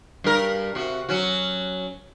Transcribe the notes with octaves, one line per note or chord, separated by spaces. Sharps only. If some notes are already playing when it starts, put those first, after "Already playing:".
G2 A#4
C3 F#4
F#3 C#4 F#4